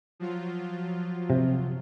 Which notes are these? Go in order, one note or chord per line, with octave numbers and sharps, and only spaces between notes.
F3 F#3 F4
C3